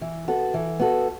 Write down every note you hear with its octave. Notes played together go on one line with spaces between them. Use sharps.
E3
B3 F#4 A4
E3
B3 F#4 A4